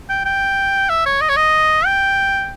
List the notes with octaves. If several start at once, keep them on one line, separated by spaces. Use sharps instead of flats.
G5
G5
E5
C#5
D#5
C#5
D#5
G5